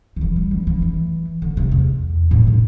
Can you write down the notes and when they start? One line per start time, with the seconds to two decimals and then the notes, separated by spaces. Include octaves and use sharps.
0.16 D3
0.21 E3
0.36 G3
0.51 E3
0.67 E3
0.82 E3
1.42 D3
1.57 C3
1.72 E2
2.31 A2
2.47 C3